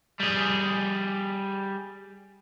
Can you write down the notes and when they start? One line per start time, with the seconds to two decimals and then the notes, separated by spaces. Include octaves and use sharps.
0.20 G3 G#4